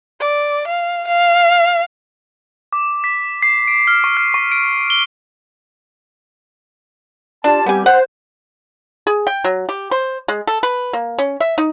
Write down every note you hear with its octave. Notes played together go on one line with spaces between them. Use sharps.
D5
F5
F5
D6
B6
C7
D7
F6
C#6
F6
C#6
D7
G7
D4 F4 G4 A5
G3 B3 C4 G4 G#5
C5 F#5
G#4
G5
F#3
G4
C5
G#3
A4
B4
A#3
C#4
E5
D#4